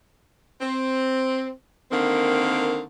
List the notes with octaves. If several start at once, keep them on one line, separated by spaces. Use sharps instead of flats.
C4
D3 D#3 A#3 C4